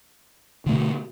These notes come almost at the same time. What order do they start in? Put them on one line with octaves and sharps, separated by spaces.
D3 A3 B2